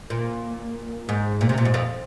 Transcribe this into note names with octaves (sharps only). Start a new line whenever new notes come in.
A#2
G#2
A#2
C3
A#2
G#2
F2